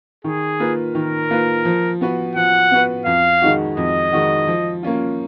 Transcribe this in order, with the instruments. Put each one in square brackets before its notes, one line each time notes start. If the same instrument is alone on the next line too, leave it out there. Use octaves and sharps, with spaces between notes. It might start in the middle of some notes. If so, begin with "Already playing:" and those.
[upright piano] D#3 [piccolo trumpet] G#4
[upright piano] A#3 F4 B4
[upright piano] D#3 [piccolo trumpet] A#4
[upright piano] A#3 F4 B4
F3
B3 F#4 B4
[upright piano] F3 [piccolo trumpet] F#5
[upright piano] B3 F#4 B4
[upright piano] F2 [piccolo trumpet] F5
[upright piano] D#3 G#3 D#4 F#4
[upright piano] F2 [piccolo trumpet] D#5
[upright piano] D#3 G#3 D#4 F#4
F3
A#3 C#4 F4